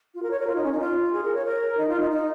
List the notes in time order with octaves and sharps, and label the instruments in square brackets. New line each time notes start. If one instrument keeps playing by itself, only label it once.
[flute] F4
A#4
C#5
A#4
F4
D#4
C#4
D#4
F4
G#4
A#4
C#5
A#4
D#4
F4
D#4
D#4